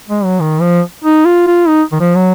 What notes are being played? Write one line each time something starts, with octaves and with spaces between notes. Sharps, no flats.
G#3
F#3
D#3
F3
D#4
F4
F4
D#4
D#3
F3
F#3